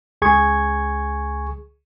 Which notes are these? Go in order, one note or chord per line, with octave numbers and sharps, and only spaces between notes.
C#2 G#4 C#6 G#6